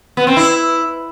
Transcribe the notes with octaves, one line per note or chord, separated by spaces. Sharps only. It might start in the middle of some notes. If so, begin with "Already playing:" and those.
B3
C4
E4